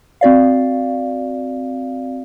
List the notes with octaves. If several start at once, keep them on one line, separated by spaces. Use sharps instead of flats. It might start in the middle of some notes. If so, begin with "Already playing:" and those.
C4 F#4 D5 F5